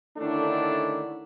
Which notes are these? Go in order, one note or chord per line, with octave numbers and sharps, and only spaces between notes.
D3 D#3 A3 C#4 D4 E4